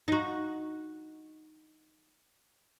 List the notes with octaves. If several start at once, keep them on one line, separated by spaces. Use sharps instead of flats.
D#4 F#4